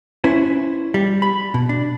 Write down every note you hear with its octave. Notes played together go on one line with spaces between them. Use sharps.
C#4 E4 B4 C5
G3
B5
B2
D4